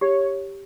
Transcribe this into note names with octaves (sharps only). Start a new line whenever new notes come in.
G4 C#5